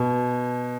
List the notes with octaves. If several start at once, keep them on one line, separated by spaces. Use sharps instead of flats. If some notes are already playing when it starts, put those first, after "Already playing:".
Already playing: B2